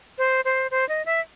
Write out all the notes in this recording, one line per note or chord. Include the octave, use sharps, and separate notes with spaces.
C5
C5
C5
D#5
E5